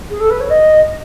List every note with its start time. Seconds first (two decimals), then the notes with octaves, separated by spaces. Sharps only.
0.10 G#4
0.20 A4
0.30 B4
0.40 C#5
0.50 D#5